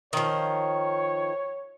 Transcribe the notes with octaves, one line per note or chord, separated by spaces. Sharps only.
D#3 F3 C#5